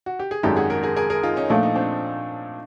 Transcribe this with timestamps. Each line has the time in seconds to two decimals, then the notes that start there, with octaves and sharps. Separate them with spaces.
0.06 F#4
0.19 G4
0.31 G#4
0.43 G#1 F#2 D#3 G#3 G4 A4
0.56 F#4 G#4
0.70 G#4 A#4
0.83 G#4 A#4
0.96 G#4 A#4
1.10 G#4 A#4
1.23 D#4 F4
1.36 C#4 D#4
1.50 A#2 F3 A3 D4
1.63 D#4
1.75 C4 D4